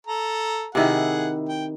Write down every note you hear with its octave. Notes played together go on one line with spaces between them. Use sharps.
A4 A#5
C3 D#3 E4 G#4 F#5
G5